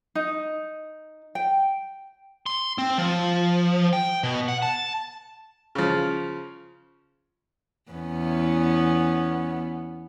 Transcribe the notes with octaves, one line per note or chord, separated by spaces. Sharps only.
D#4
G5
C6
C4
F3
G5
B2
F#5
A5
C#3 F3
E2 B3 C#4